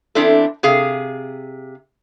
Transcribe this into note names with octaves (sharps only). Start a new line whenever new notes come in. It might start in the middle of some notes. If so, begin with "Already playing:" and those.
E2 C4 D4 E4 A4
C3 G#4 F5